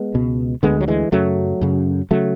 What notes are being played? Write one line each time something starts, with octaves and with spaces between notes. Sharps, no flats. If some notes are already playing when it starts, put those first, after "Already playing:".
Already playing: G#3 B3
C#2 B2
D2 D3 G#3 B3
F#3
E3 G#3
F#2 C#3 F#3 A3
F#2 C#3
C#3 F#3 A3